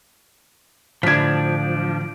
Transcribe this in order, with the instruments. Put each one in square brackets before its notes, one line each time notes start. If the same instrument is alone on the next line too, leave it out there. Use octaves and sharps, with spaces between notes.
[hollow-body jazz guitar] A2 D3 [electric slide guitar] F3 D4 [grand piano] G#6 B6